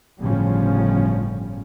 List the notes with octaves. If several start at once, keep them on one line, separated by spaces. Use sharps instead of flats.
G1 A2 C#3 F3 G3 C#4